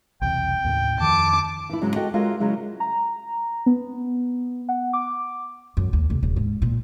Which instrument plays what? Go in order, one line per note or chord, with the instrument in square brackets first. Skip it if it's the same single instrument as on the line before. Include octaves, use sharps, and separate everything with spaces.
[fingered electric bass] B1 E2 C3 [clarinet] G5
[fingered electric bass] D#2 A2 C#3
[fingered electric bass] F2 D#3 F3 [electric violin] A5 D6
[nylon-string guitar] E3 E4
G#2 C#3 F#3 G#3
F#4 A4 D#5 G5
G#3 F4 F#4 A#4 C#5 E5
C#3 F#3 G#3 E4
[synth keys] A#5
B3
F#5
D6
[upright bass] F#2
D#2
F1
D#1
G#2
A#2